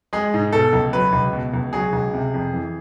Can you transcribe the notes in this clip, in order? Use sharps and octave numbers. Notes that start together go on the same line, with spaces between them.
G#3 G#4
G#2
B2 A4
C#2
F#3 B4
C#2
B2
C#2
F#3 G#4
C#2
C3
F2
E3